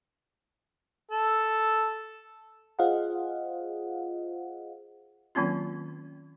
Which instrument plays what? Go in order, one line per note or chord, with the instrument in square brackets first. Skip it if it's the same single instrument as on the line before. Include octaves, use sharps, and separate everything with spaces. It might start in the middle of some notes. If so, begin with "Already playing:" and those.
[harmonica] A4
[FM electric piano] F4 G#4 C5 D#5 F5 F#5
[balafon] D#3 F#3 A#3 C4 C#4 F4